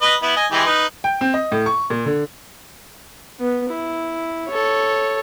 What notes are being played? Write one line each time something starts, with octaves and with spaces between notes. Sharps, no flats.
B4 D#5
B3 E4
D#5 G#5
E3 G#3 G4
D#4 B4
G5
C4
D#5
A2
C#6
A#2
D3
B3
E4
A4 C#5